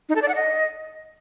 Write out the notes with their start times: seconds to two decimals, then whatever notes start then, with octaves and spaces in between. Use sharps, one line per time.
0.09 D#4
0.15 A4
0.22 D5
0.28 F#5
0.35 D#5